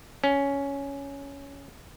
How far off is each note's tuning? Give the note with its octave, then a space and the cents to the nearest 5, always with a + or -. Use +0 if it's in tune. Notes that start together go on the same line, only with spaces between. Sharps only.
C#4 +10